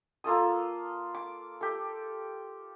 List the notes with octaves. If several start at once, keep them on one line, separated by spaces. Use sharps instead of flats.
A#3 F4 A4 D#6
D6
G4 A4